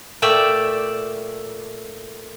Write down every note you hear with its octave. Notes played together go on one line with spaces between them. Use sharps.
A#2 A3 D5 E5 G5